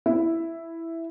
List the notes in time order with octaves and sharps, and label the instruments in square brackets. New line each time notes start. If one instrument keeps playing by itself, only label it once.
[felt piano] E4